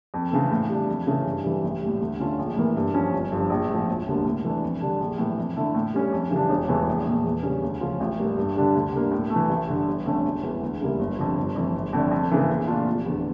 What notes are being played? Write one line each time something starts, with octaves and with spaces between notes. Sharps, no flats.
F2
C#3 E3 A3
A2
G3 D4
F2
C#3 E3 A3 C#4
G2
E3 G3
A1
A2 G3
D2
D3 A3 C#4 F4
A#1
A2 E3 A#3
G2
F3 C#4
G1
G2 F3
A#1
A2 F3
E1
D2 D3 G3 A#3
A2
E3 A3 D4
F2
D3 G3 D4
A#1
A2 E3
F2
D3 A3 E4
A2
G3 C#4
F2
C#3 E3 G3 D4
E1
E2 E3 A3
A#1
A#2 A3
E2
C#3 G3 C#4
D2
C#3 F3 C#4 F4
A1
A2 G3 A#3
G2
D3 G3 D4
D2
D3 G3 A#3
A2
A3
E3
A1
G2 D3
G1
F2 D3 A3 C#4
E1
E2 E3
D2
C#3 G3 A#3 E4
G1
F2 D3 F3
G1
F2 E3 A3
G1
F2 D3 A3 D4
F2
C#3 E3 A#3
A#1
A#2 A3 D4 F4
F1
E2 D3